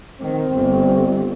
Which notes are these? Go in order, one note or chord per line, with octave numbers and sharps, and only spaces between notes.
D#3 C4
G1